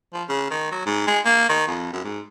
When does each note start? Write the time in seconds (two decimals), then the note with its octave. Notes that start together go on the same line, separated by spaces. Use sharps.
0.13 F3
0.29 C#3
0.50 D#3
0.71 F#3
0.86 G#2
1.07 G#3
1.25 A#3
1.49 D#3
1.67 F2
1.93 F#2
2.04 G#2